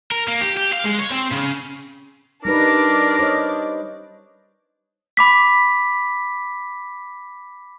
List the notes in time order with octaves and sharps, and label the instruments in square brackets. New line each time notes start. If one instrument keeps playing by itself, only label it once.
[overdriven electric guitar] A#4
A#3
G4
G4
F5
G#3
C#5
C4
C#3
[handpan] G3 D#4 B4 [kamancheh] D4 D5 [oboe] A#4
[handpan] C5 C#5 D#5
[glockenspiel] B5 D6 B6